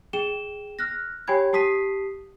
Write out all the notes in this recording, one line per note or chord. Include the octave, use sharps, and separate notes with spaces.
G#4 G5 E7 G7
F6 F#6 A#6
G4 C#5 G5 G#5 B5 G#6
G4 A5 D#6 B6 C7 D#7